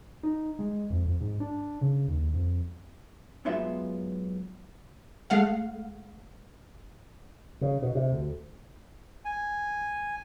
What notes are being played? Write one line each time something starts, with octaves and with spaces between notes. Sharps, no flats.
D#4
G#3
F2
F2
G#2
D4
C#3
D#2
F2
F#2 G#3 B3 F4 E5
G#3 A3 F5 F#5
C#3
B2
C3
D2
G#5